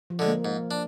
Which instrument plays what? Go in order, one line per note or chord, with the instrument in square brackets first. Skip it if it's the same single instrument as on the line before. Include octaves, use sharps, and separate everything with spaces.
[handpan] F3
[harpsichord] D3 G#3
[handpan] A#3
[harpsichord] G#2
D4